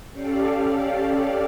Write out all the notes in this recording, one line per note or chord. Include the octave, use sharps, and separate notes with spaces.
C#4 G4 A4 D5 F5